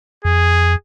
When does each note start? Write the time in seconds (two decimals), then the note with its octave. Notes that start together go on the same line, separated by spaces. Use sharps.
0.25 F2 G#4